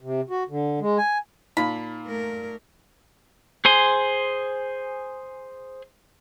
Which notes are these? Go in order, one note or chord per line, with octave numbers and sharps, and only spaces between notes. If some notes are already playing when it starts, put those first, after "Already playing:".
C3
F#4
D3
G#3
G#5
A#2 D#4 F4 B5
A3 A#4
G#4 C5 G#5 C6